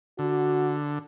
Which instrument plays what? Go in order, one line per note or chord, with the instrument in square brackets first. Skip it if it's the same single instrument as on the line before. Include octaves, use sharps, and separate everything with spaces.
[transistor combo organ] D3 [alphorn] F#4